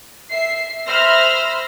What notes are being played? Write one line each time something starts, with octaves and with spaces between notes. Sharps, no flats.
E5 C7
C5 E5 B5 F6 A#6